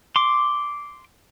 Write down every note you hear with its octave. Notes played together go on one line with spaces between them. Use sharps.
C6 D6